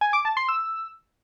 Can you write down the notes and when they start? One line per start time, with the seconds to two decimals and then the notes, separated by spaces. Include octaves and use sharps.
0.01 G#5
0.13 D6
0.25 A5
0.37 C6
0.48 E6